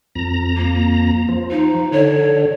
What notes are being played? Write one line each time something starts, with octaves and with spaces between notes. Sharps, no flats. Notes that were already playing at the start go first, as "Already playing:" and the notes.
F2 A#5
A#3
F3
D#4
D3 C#5